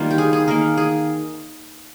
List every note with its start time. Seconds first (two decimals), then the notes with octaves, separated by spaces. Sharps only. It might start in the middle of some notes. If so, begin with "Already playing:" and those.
Already playing: D#3 G3 A#3 F4
0.11 G4
0.18 G#4
0.33 G#4
0.48 D#3 A#3 A#4
0.77 G#4